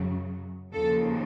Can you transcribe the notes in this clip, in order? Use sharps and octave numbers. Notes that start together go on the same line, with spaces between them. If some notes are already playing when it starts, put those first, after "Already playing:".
Already playing: F#2 C#3 F#3
D#2 C#3 F3 A4